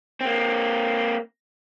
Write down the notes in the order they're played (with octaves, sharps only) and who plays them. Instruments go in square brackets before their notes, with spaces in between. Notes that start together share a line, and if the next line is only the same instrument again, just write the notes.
[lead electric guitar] A#3 C4